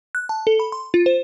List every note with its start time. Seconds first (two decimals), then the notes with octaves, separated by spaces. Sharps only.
0.15 F#6
0.29 A5
0.47 A4
0.59 B5
0.72 C6
0.94 F4
1.06 C5